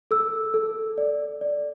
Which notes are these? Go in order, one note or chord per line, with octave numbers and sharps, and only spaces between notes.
A4 E6
A4
D5
D5